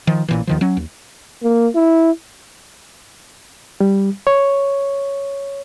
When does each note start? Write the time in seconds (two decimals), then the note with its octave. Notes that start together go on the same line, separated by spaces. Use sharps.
0.07 D#3 F3
0.28 A1 A#2 E3
0.47 D#2 D#3 F3
0.61 F#3 C#4
0.77 D#2
1.43 A#3
1.75 E4
3.80 G3
4.27 C#5